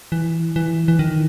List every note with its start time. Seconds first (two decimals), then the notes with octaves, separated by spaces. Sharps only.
0.12 E3
0.56 E3
0.88 E3
0.99 D#3